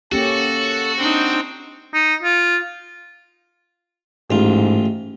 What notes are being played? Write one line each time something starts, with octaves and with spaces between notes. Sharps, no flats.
A#3 C#4 F#4 G4 A4
C4 D4 D#4 G5
D#4
F4
A1 G#2 F4